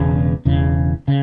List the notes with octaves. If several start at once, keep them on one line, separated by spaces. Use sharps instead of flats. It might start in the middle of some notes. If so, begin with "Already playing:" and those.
Already playing: E1 E2 C#3
E1 E2 C#3
C#3